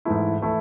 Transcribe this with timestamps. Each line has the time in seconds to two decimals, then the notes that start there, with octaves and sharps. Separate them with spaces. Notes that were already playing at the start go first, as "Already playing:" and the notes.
0.05 G#2 E3 A3 E4
0.42 E3 A3 E4